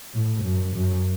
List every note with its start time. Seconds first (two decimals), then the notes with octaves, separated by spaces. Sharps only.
0.14 A2
0.44 F#2
0.75 F#2